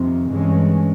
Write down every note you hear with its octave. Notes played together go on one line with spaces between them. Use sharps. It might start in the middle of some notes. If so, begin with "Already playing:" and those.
Already playing: F2 C3 D#3 C4
G2 E3 G#3 C#4